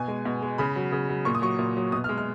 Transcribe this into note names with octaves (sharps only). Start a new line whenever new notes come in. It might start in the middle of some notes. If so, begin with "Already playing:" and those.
Already playing: B2 G#5
G#3
B2
G#3
C#3 B5
F#3
C#3
F#3
A#2 C#6
D#6
F#3 C#6
A#2
F#3
B2 D#6
F6
G#3
F6